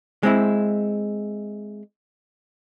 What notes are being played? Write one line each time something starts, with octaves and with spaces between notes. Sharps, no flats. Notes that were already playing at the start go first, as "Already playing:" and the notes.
G#3 C4 E4